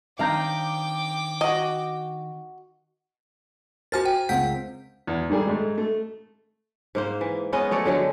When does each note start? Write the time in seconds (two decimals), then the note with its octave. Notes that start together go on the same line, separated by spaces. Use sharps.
0.19 D#3 C4 D4 F5 G5 A#5 D6 G6
1.41 F#4 D#5
3.92 F#4 A#4 C5 G#5 F6 A6
4.05 G5
4.29 C#2 C4 F#5 G6 B6
5.07 E2
5.29 G#2 D#3 G3 G#4
5.47 G#2 G#3 A3
5.78 A3
6.95 G#2 A#3 C5
7.21 E3
7.53 G#3 B3 C#4 D#5
7.71 A3 C#5 D5
7.86 D3 F#3 G#3 A3